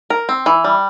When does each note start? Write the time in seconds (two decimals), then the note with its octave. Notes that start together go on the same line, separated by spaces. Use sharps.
0.10 A#4
0.29 C4
0.46 E3
0.64 G3